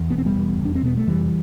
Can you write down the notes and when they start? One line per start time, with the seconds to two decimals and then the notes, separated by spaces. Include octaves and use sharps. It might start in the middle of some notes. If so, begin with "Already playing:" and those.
Already playing: E2
0.10 E1 B3
0.18 C4
0.25 G3 B3
0.35 E2
0.59 F1
0.65 D4
0.75 C4
0.83 B2 B3
0.97 A3
1.07 F1 E3 G3